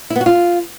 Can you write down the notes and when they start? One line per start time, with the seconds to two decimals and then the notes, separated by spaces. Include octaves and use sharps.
0.10 E4
0.16 B3
0.21 F#4
0.26 F4